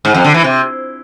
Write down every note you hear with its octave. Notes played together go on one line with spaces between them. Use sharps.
G#2
F2
D3
E3
C3